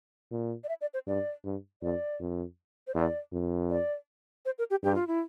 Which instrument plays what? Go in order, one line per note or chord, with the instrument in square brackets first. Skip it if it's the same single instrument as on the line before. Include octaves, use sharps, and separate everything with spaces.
[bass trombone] A#2
[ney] D5
E5
D5
C5
[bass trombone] G2 [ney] D5
[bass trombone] G2
[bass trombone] F2 [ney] D5
[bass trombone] F2
[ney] C5
[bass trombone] E2 [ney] D5
[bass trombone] F2
[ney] D5
C5
A#4
G4
[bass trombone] G2 [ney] G4
[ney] F4
E4